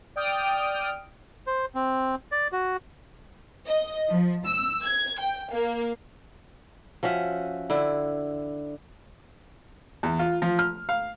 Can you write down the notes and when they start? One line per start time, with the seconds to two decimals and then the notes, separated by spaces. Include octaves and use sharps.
0.16 D5 G5 D#6 F6 D7
1.47 C5
1.75 C4
2.32 D5
2.52 F#4
3.66 D#5
4.10 F3
4.46 E6
4.84 G#6
5.21 G5
5.51 A#3
7.03 F3 C#4 F#4 E5
7.70 D3 E4
10.03 E2
10.19 F4
10.42 F3
10.59 F6
10.89 F5